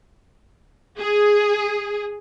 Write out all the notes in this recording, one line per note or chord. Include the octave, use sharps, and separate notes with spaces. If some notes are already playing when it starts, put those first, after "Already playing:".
G#4